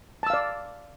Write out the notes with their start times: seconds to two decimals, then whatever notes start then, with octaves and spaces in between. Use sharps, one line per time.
0.23 A5
0.27 E6
0.30 F5
0.34 D5